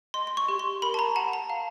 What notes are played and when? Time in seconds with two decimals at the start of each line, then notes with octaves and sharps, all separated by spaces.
0.14 D#5 C6
0.27 C6
0.37 C#6
0.48 G4
0.59 C6
0.82 A#4 B5
0.94 A5
0.99 A#5
1.16 F#5 A5
1.33 A#5
1.50 F5